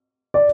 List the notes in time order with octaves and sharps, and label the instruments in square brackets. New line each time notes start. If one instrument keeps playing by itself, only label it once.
[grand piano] D5